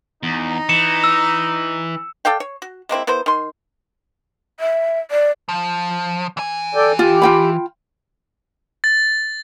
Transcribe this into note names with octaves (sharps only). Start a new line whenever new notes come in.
E2 D#4 A#5
E3 C#7 E7
E6
A4 D5 F5 G5
C#5
F#4
G#3 A#3 C4 E4
B3 E4 A#4 C5
D#3 C6
E5
D5
F3
E3 G#5
A4 D5 G5
F4 G4
F4 G5 B5
A6